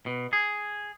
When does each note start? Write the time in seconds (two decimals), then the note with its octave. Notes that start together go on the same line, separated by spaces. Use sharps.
0.06 B2
0.33 G#4